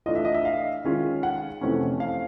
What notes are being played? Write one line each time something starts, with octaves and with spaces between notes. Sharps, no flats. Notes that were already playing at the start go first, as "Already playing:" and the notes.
E3 A3 D4 F4 D#5
E5
D#5
E5
F5
D#3 G#3 C#4 F4
F#5
F2 C3 E3 A3 C#4
F5